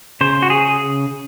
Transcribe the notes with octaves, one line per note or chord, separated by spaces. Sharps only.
C#3 C5
F#4
G#4